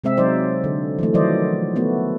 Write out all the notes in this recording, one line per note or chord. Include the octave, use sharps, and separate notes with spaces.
C3 G#3 C4 E5
F#3 D#4 C5 D5
D3
E3 F#3 A3
D#3 F3 F#3 C5 D5 D#5
A3 B3 F#4